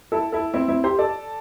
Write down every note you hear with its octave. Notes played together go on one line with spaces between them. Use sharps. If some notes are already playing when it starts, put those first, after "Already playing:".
E4 A4
E4 A4
C4 E4
C4 E4
G4 C5
A4 D5